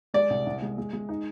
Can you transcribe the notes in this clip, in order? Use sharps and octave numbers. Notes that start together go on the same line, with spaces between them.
G#3 D5
C2
C2
G#3
G#3
G#3
D#4